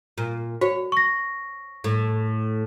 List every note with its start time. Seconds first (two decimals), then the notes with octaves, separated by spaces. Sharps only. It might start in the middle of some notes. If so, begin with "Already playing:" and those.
0.18 A#2
0.61 F#4 C#5
0.92 C#6 A#6
1.84 A2